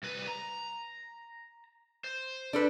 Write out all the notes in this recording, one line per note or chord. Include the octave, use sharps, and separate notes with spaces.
C2 B4
A#5
C5
D4 A4 B4